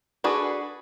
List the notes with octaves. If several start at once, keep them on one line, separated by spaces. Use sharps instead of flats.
D4 F#4 G#4 A4 B4